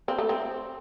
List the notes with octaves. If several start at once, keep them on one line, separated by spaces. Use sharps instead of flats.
C4
A3
C4